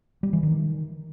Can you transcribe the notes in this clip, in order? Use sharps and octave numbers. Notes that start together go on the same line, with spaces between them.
G3
E3
D#3